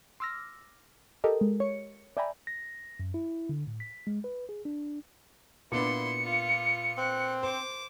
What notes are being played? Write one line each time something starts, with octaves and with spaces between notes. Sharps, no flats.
C6 D6 E6 F6 A#6
G4 A4 A#4 D#5
G#3
C#5 C#7
D5 E5 G5 G#5 A#5 B5
A#6
F#2
E4
D3
A2
B6
G#3
B4
G#4
D4
A#2 B3 D4 E4 C6 C#7
F4
C4 F#6
C5 D6